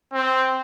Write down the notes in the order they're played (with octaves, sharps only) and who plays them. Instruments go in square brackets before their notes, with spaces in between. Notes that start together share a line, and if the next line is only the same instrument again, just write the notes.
[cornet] C4